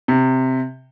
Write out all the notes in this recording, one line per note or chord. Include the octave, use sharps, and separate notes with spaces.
C3